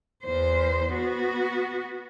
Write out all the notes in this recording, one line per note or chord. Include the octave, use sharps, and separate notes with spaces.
E2 C5
B3 F#4